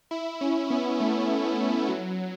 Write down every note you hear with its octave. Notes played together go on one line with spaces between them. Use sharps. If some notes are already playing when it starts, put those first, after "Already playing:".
E4
C#4
B3
A3
A3
F#3